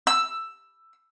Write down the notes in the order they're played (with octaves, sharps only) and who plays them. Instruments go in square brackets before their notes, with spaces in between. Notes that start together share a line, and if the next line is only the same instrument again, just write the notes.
[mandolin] E6